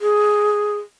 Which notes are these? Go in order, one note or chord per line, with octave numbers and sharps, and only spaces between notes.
G#4